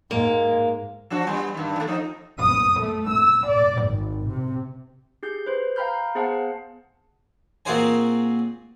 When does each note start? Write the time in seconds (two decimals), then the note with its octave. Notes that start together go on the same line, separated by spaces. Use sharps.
0.11 G#2 G#3 A#3
1.10 F3 D4 F#4
1.27 G3 B3
1.55 G2 D#3
1.76 D#3 A3
1.87 F3 D#4
2.40 D#6
2.82 A3
3.11 E6
3.48 D5
3.83 G#1
4.30 C3
5.23 G4 G#4 G6
5.46 B4 C5
5.76 F5 G5 A#5 B5 F6 G6
6.15 B3 G#4 C5 F5 F#5 A5
7.65 A#2 C4 F#4 G#4 C5 G#5